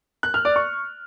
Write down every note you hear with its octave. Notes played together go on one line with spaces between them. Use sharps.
F#6
F6
D5
C#6